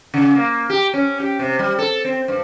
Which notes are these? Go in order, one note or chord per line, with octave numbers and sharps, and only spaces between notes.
C#3
A#3
G4
C#4
G4
C3
G3
A4
C4
G2